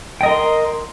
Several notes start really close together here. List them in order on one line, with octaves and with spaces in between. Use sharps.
G5 D#5 A#4 C6